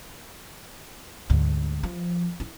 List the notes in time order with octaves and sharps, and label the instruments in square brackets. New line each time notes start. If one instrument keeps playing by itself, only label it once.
[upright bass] D2 G#2
F3
E4